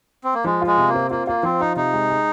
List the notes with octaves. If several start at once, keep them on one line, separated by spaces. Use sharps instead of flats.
C4
A#3
F3 G#3
F4
G#3
C3
A#3
C4
A#3 F4
A#3 F4
F3 C4
D#4 F4
C3 D#4
G#3
G#3